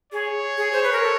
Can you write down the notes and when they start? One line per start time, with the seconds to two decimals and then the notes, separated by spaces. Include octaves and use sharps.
0.13 G#4 C#5
0.58 G#4
0.73 C5
0.83 B4
0.93 A#4
1.03 A4